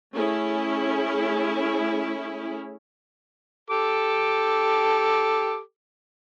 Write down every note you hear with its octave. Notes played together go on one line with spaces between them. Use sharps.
A3 C#4 E4 G#4
G4 A4 D6